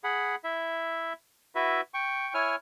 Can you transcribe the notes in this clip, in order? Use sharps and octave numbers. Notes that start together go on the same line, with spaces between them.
G#4 F#5 B5
E4 E5
E4 F#4 B4 E5
G5 C#6
E4 C#5 G#5 F6